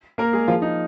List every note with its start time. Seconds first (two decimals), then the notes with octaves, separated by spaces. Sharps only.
0.18 A#3 A#4
0.33 G#3 G#4
0.48 F3 F4
0.62 D#4